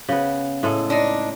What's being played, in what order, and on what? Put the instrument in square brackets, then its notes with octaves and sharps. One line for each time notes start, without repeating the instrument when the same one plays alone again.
[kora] C#3 B3
A2 G#3 A4
[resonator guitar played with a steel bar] D4 D#4